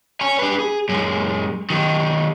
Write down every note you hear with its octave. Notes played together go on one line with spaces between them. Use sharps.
C#5 G#5
D4 B4
G#4
F#2 G#3
D#3 F#3